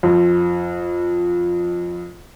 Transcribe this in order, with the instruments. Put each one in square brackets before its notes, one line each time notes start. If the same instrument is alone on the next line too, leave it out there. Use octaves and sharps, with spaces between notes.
[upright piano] F2